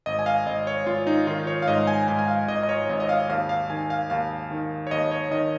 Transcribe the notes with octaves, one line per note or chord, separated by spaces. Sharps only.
G#1 D#5
G#5
F5
G#1 D#5
C#5
G#1 F4
D#4
D#3 F4
C#5
F5
G#2 D#5
G#5
G#2 G#5
G#5
F5
G#1 D#5
D#5
C#5
G#1 D#5
D#5
F5
D#2 F5
F5
D#3 G#5
F5
D#2 F5
D#3
C#5
D#2 D#5
C#5
D#3 D#5